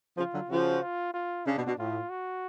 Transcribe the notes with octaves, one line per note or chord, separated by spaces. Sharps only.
C#3 F3 F4
D3 F#3
C#3 F3 F#4
F4
F4
C#3 D4
B2
B2
A2 F4
F#4